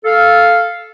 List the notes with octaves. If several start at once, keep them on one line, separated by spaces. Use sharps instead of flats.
A4 F5